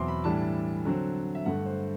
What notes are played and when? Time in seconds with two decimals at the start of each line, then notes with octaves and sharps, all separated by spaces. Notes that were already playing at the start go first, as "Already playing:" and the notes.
Already playing: E2 B2 F#3 C4 E4 C6 D6 E6
0.08 B5
0.24 A2 E3 G3 D4 A5
0.85 D3 F#3 C4
1.35 E5
1.46 G2 D3 A3 F#5
1.66 C5